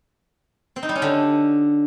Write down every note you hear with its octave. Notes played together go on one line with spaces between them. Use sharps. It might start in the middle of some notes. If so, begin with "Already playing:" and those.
C4
D#4
G3
C#4
D3